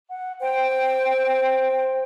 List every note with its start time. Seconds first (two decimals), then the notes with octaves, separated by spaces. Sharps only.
0.10 F#5
0.40 C5 G5